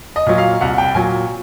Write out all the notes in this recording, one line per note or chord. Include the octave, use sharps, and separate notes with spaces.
D#5
A#2 F#3
F5
C2 F#5
G5
A#2 F#3 G#5